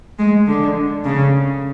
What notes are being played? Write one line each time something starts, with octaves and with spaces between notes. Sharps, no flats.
G#3
D3
C#3